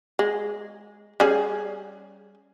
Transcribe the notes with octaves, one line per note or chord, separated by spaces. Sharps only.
G#3
G3 C#4 G#4